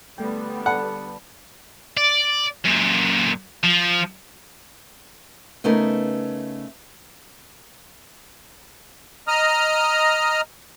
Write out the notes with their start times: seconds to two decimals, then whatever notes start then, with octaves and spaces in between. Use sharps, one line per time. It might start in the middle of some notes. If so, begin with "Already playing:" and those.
0.18 D3 G3 A3 B3 G5
0.66 A4 D5 F#5 A5 B5
1.97 D5
2.65 F#2 A#2
3.64 F3
5.64 C#3 A3 B3 D#4 A#4
9.28 D#5 A#5 D#6 F6